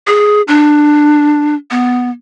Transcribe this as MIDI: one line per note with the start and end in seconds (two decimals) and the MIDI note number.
0.07 0.42 68
0.48 1.55 62
1.71 2.10 59